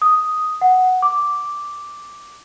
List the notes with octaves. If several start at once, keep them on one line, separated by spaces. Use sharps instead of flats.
D#6
F#5
D6